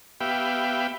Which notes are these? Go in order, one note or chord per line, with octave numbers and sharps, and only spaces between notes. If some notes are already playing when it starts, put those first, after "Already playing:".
B3 G4 E5 F5 G5 B5